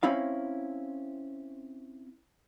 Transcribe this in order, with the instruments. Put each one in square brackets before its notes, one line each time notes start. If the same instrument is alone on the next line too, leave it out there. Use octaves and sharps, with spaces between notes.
[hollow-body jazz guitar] C4 C#4 E4 F5